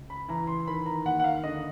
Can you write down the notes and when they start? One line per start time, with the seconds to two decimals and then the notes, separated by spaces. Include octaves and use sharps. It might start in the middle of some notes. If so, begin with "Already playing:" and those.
Already playing: C#2
0.10 B5
0.28 E3 A#5
0.47 C6
0.67 D#3 B5
0.86 A#5
1.05 D#2 F#5
1.19 F#5
1.24 F5
1.43 D3 D#5